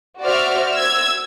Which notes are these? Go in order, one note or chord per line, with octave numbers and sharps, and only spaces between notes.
F#4 C5 D5 E5 F6
E6 G#6